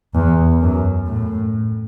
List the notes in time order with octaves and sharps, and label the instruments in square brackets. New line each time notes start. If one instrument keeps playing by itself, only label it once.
[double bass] E2
F#2
A2